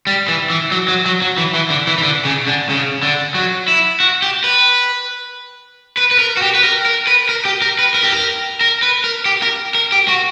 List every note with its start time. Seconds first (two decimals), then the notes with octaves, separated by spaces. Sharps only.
0.07 G3
0.28 E3
0.50 E3
0.72 F#3
0.88 F#3
1.06 F#3
1.22 F#3
1.38 E3
1.55 E3
1.70 D3
1.87 E3
1.98 E3
2.03 D3
2.25 C#3
2.47 D3
2.69 C#3
3.03 D3
3.35 F#3
3.68 E4
4.00 F#4
4.22 G4
4.44 B4
5.97 B4
6.11 B4
6.19 A#4
6.37 F#4
6.42 G4
6.55 B4
6.64 A#4
6.86 A#4
7.07 B4
7.29 A#4
7.45 G4
7.62 A#4
7.79 B4
7.94 A#4
8.03 G4
8.12 A#4
8.61 A#4
8.82 B4
9.04 A#4
9.26 G4
9.42 A#4
9.75 A#4
9.92 G4
10.08 F#4